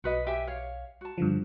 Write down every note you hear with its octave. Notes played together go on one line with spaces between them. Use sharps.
B1 F#4 B4 D#5
G4 E5 G#5
C#5 F5
F#4 A5
G2 D3 F3